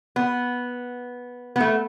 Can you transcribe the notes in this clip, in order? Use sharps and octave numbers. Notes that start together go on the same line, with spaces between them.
B3
B3
A3